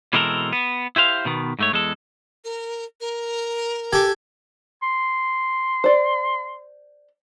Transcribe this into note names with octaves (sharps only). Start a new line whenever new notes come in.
B2 E3 G#3 C4 A4 A#4
B3
E4 G4 C5 F5
B2 D#3 B3
G#2 A3 C#5
E2 G#3 A4
A#4
A#4
G4 A4 G#5
C6
C5 D5